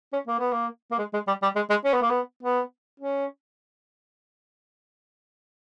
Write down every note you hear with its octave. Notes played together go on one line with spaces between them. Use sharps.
C#4
A#3
B3
A#3
A#3
G#3
G#3
G3
G3
G#3
G#3
C#4
B3
A#3
B3
B3
C#4